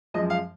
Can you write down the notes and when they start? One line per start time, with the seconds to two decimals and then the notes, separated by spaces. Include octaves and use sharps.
0.14 F#2 F3 G#3 D#5
0.30 F5